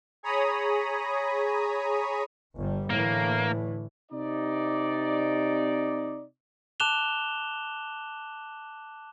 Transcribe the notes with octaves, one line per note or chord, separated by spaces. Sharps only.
G#4 C#5 A#5 B5 D#6
G1 G3
A2 D3 E3 A#3
C3 D#4 D5
A5 D6 F#6 E7 F7 G7